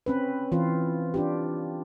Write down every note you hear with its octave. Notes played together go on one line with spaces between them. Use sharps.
C4 C#4 B4
E3 C4 F4
D4 F4 G4